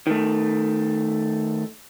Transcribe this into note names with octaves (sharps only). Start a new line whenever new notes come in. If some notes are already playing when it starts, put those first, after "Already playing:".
D#3 A3